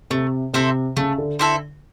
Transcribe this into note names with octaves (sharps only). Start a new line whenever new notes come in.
C3 A3
C3 C4 E4 A4
C#3 A3
D3
D3 C4 E4 A4